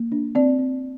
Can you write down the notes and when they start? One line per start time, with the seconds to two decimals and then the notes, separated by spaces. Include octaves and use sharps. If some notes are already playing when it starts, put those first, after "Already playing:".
Already playing: A#3
0.12 D4
0.35 C4 D5
0.59 C4